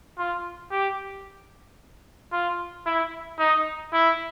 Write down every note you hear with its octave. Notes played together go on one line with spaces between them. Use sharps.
F4
G4
F4
E4
D#4
E4